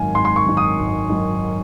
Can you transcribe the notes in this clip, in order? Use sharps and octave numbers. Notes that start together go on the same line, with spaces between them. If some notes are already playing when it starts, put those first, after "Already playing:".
Already playing: G#1 F#2 D#3 F5 G#5
G#1 C6
C6
C#6
F#2 D#3
D#6
G#1
F#2 D#3